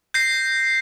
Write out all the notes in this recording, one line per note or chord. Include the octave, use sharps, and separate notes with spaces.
G6 A#6 C7